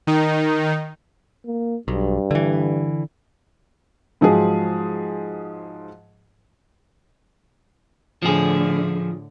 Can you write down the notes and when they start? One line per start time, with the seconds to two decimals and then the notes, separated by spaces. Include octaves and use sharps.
0.07 D#3 D#4
1.46 A#3
1.88 B1 G2
2.31 D3 E3
4.21 G#2 F3 F#3 G#4
8.22 A2 D3 F3 G#4